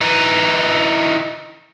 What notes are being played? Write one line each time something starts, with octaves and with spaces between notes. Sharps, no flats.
E3 D#4